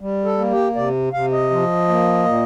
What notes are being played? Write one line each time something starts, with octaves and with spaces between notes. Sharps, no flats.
G3
A4
A#3
G4
C3 D5
C3 F5
D#5
F3
A#3
A#2